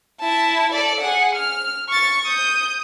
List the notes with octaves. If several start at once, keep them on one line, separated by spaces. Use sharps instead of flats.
E4 A5
A4 D5
G#4 F#5
F6
C#6 A6
D#6 G6